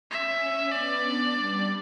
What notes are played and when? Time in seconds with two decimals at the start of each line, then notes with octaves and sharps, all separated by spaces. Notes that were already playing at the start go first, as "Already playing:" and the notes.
0.11 C#4 E5
0.72 B3 D5
1.01 D4
1.33 G3